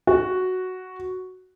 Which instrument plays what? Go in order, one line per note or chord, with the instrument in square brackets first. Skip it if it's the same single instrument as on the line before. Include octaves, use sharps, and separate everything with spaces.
[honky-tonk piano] F#4